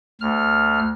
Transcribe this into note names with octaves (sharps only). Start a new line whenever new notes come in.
D2 F6